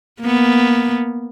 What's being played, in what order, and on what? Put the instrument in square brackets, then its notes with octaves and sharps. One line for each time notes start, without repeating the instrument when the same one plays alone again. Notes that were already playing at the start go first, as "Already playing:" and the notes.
[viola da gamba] A#3 B3